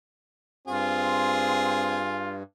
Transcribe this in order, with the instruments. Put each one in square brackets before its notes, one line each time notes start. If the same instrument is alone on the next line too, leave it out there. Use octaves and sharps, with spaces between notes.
[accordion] G2 [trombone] C4 [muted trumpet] F4 [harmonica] G#4